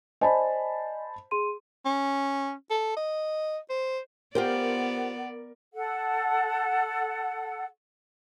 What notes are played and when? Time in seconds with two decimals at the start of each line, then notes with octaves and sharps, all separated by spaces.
0.21 C5 D5 D#5 G#5 A5 B5
1.31 G#4 C6 D#7
1.86 C#4
2.70 A4
2.97 D#5
3.69 C5
4.35 B3 F4 G4 A#4 C5 D5 F#5
5.74 A4 F#5